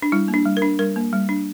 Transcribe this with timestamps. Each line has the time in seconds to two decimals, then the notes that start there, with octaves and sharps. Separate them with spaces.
0.02 D4
0.12 G3 E4
0.28 A#3
0.34 D4
0.45 G3
0.57 A#4
0.62 D4
0.79 G3 A#4
0.96 A#3
1.13 G3
1.29 D4